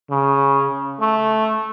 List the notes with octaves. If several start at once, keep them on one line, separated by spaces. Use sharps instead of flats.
C#3
A3